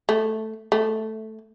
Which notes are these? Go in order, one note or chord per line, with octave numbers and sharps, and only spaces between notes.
A3
A3